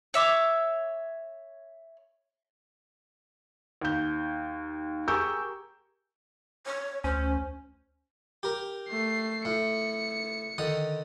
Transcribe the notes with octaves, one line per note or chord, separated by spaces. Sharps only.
C#5 E5 D6
D#2 G6
G4 G#4 A#4 C#6 E6 G6
C#5
D2 C#4 C5
G4 A#4
A3 C7
A2 C#7
D3 D#3 D#6